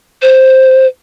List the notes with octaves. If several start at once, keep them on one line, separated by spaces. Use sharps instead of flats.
C5